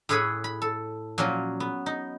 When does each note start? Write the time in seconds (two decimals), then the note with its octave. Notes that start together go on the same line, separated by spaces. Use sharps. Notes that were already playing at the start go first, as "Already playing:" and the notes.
0.09 A2 E4 G#4 B4 C#5 B5
0.44 B5
0.62 A4
1.18 A#2 F3 F#3 C#4 F#4
1.60 B3
1.86 D#4